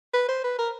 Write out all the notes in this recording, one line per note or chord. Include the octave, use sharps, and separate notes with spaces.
B4
C5
B4
A#4